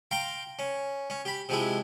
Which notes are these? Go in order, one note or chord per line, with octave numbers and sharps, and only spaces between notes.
F5 G5 A#5 C6
C#4
C#4
G4 B5
C3 F3 G#3 E4